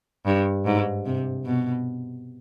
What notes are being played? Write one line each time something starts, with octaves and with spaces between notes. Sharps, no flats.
G2
G#2
C3
B2